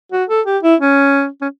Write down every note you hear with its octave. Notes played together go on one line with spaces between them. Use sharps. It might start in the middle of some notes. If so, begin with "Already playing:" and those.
F#4
A4
G4
E4
C#4
C#4